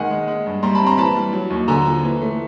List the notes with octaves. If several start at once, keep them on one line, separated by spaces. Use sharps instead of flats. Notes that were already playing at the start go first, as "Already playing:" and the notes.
Already playing: D#3 G#3 F#5 G#5
G#3
G#3
G2
G3 A#5 C6
A5 B5
C4
A#5 C6
E3 A5 B5
G3
F#3
D#2
D3 G#5 A#5
F3
E3
A3